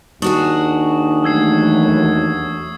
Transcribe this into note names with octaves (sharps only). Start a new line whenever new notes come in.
D#2 D4 F#4 G#4 C#6 D#6 F#7
E2 F#3 A3 E6 G#6 C7